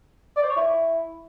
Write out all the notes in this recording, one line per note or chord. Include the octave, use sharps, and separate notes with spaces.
D5
C5
C#5
E4